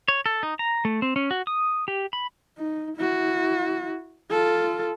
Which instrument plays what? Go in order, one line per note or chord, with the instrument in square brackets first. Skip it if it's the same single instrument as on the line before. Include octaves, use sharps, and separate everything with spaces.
[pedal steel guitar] C#5
A4
D#4
A#5
A3
C4
C#4
F#4
D#6
G4
B5
[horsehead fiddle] D#4
E4 F#4
F4 A4